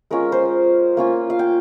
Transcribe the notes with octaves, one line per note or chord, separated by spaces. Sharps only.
G#3 C#4 F4 A#4
C5
A#3 C#4 F4
F5
G5